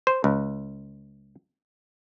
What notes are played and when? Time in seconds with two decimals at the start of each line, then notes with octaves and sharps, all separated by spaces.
0.07 C5
0.24 C#2